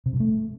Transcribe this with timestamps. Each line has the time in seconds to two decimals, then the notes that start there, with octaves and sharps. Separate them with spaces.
0.06 C3
0.13 G2
0.20 A3